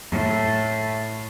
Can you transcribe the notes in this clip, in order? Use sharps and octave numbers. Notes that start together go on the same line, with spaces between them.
A2